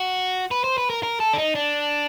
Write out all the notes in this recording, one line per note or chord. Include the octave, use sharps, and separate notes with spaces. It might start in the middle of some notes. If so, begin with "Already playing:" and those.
Already playing: F#4
B4
C5
B4
A#4
A#4
A4
D4
D#4
D4